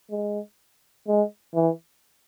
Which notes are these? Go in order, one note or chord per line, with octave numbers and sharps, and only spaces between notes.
G#3
G#3
E3